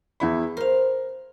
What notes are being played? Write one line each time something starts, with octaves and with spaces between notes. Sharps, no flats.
E2 E4 B5
A#4 C5 F5